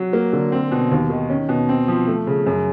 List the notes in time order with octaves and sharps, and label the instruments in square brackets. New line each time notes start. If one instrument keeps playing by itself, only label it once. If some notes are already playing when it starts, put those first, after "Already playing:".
Already playing: [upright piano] F#3
A#3
D3
C4
B2
D#2
D#3
C#4
B2
C4
F3
A3
C#3
F#2